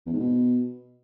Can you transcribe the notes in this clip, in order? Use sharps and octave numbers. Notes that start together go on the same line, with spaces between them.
E2
G#2
B2